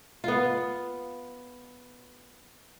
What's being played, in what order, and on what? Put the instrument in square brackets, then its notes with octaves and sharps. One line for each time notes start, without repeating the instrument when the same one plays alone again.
[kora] B3 F4